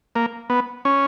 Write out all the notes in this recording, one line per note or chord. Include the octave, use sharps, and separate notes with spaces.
A#3
B3
C#4